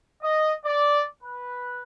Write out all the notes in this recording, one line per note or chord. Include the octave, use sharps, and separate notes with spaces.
D#5
D5
B4